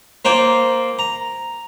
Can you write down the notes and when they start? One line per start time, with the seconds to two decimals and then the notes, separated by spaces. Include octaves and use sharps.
0.25 A#3 F4 C5 G5
0.99 A#5